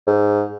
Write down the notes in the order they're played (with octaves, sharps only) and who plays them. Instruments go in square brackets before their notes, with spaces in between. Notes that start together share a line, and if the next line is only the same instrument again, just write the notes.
[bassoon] G#2